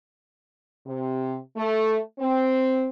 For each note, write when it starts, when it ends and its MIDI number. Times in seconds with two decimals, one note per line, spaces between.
0.86 1.36 48
1.56 1.98 57
2.20 2.88 60